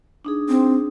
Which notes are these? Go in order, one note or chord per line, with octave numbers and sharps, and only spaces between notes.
D4 D#4 G#4
C4